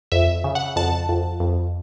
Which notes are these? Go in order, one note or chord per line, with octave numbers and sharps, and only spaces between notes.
F2 E5
C#3
F#5
F2 A5
F2
F2